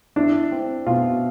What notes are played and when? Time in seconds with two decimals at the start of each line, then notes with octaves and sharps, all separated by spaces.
0.16 D4 E4
0.51 C4
0.86 B2 F4